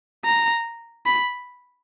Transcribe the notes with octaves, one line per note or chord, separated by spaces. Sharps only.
A#5
B5